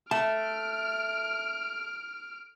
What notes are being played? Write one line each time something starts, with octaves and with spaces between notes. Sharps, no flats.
A3 A5 F6 D7